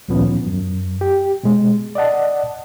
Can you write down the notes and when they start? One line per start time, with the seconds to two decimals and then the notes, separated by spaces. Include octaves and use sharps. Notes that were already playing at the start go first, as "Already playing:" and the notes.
0.08 D2 A#2 D#3 F3 B3 C#4
0.46 F#2
1.01 G4
1.43 B2 G#3
1.95 D5 D#5 F#5 A5